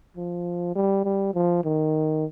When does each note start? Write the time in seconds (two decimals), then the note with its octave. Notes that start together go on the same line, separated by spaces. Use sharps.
0.17 F3
0.76 G3
1.05 G3
1.34 F3
1.64 D#3